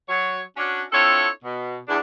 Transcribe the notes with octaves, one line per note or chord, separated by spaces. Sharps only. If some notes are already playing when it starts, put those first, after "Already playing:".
F#3 C#5
C#4 D4 F#4
C4 D4 E4 F4 A4 C#5
B2
E2 D4